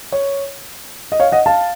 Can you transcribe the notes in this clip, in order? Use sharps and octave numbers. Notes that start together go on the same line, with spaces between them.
C#5
D#5
C#5 F5
D#5 F#5
F5 A5